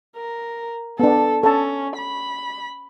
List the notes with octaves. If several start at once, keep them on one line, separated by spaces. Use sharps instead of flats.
A#4
B3 D4 A4
C#4 A4 A5
B5